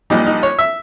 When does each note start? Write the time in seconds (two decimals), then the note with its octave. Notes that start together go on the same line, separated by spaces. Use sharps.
0.10 A#1 A#2 G3 D#4
0.26 D#4
0.43 C#5
0.59 E5